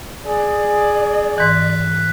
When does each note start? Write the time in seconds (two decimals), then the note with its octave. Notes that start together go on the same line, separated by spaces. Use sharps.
0.24 G#4 D5
1.38 G#2 E3 F#6 B6